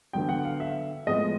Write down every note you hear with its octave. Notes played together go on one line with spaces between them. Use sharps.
D3 F#3 B3 G5
F#5
F5
E5
A2 F3 G#3 B3 D#5